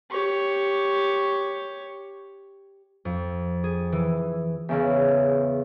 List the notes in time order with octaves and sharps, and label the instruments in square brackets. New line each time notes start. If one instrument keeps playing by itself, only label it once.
[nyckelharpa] G4 C#5
[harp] F2
G#4
E3
E2 C#3 E3